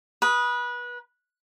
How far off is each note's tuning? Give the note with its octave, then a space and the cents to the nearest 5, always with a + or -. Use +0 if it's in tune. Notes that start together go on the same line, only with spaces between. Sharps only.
B4 -25 D#6 +0